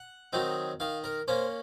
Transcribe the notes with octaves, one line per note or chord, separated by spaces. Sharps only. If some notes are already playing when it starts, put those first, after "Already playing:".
Already playing: F#5
D#3 F#3 C4 D#4
D#3 F5
A#4
A#3 C#4 C5